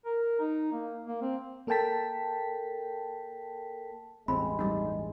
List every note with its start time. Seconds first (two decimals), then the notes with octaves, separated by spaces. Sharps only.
0.06 A#4
0.40 D#4
0.72 A#3
1.07 A#3
1.22 C4
1.67 A#3 A4 A#4 G5 A5 B6
4.28 A1 E2 G2 G#3 C4 B5
4.59 G3 D#4